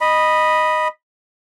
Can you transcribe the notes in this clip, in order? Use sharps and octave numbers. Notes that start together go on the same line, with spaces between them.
D#5 B5